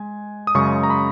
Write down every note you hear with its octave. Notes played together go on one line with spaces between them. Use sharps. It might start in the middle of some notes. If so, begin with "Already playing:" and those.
Already playing: G#3 G#5
D#6
F#2 C#3 G#3 C#6
A#5
B5